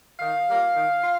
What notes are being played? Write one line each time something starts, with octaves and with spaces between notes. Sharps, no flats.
D#3 F5
G3 A#3 F4
D#3
F4